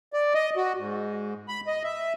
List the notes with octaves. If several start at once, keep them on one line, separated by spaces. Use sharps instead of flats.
D5
D#5
F#4
G#2
B5
D#5
E5